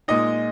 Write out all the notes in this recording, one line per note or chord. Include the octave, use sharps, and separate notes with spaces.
A#2 G#3 D#4 D#5